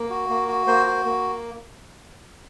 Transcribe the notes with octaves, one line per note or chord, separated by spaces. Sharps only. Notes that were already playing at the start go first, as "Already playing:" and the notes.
Already playing: A#3
F#4
A#3
F#4
A#3 C5
F#4
A#3